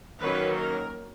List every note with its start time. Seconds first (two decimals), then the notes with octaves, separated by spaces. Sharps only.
0.22 D#3 F#3 A#3 C#4 B4
0.59 A#4